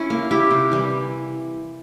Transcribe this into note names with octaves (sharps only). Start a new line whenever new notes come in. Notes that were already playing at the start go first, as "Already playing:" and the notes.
Already playing: C#4 E4
A#3
E4 G4
C3
E3 G3